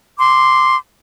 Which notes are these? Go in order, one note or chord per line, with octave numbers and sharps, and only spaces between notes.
C6 D6